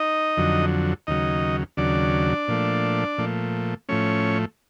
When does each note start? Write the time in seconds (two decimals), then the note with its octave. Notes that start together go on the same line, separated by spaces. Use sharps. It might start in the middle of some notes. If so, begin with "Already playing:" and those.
Already playing: D#4 D#5
0.37 F2 D3 F#3
1.07 D#2 C#3 F#3 D#4 D#5
1.77 D#2 C#3 F#3 D4 D5
2.48 A#2 F3 A3
3.18 A#2 F3 A3
3.89 A2 F3 A3 C#4 C#5